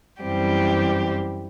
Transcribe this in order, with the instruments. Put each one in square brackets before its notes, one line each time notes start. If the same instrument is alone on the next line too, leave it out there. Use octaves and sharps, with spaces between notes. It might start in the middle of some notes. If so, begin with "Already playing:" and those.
[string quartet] F#2 E3 G3 C4 G4